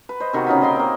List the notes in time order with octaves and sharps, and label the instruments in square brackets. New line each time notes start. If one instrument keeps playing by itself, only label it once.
[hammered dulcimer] B4
C5 D#5
C3 D#3 B3 F#4
C#3 D#4 F4 B5
A#2 D#4 G5 C6
A#3 C4